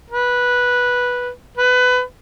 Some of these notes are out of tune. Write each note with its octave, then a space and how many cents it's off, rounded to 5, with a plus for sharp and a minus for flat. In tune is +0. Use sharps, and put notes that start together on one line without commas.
B4 -10
B4 +20